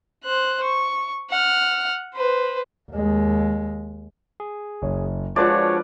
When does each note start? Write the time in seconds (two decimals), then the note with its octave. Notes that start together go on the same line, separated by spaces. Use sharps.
0.24 C5 F#6
0.63 C#6
1.30 F#5 F6
2.15 B4 C5
2.91 D#2 G#3
4.40 G#4
4.82 F#1 C#5
5.36 F3 G#3 D4 F4 F#4 B4 C#5 D5